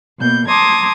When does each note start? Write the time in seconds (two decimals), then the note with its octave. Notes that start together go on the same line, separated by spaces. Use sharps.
0.18 B2 A#3 G6
0.48 A5 A#5 C6 D6 D#6 G#6